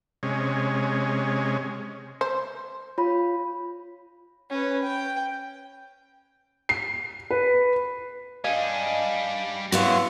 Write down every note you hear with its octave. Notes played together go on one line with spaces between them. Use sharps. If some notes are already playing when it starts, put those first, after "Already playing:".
C3 G#3 C#4
C5
F4 C#5 B5
C#4 B4
G5
C7
B4
G3 D4 D#5 F5 G#5
B3 E4 F#4 C#5 F5